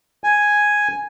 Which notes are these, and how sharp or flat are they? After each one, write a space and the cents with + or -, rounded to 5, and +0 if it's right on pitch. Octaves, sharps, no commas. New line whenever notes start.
G#5 +0